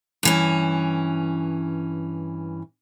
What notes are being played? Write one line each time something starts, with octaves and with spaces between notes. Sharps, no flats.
G2 E3 C#4